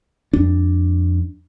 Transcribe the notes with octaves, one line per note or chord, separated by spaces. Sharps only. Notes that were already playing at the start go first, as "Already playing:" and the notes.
F2 D4